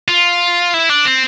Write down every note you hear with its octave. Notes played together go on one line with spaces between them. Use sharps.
F4
E4
D4
C4